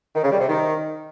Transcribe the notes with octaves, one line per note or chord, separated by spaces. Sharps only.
D#3
C#3
G3
C3
D#3